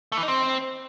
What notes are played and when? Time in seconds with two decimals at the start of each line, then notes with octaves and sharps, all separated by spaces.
0.12 A3
0.17 E3
0.23 D#4
0.28 C4